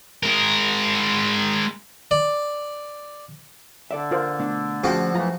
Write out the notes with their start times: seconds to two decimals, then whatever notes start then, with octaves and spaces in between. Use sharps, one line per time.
0.23 G#3 A#4
2.11 D5
3.91 D3 A4 D5 E5
4.11 F4 A#4 C5
4.39 B2 A3 D4
4.84 F3 A3 C#4 F#4 G#4 G5
5.15 F#2 E3 A3 F4 A#5